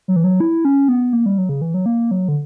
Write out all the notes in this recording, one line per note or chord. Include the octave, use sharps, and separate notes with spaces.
F#3
E3
F#3
E4
C#4
B3
A#3
G3
F#3
C#3
E3
F#3
A#3
F#3
D3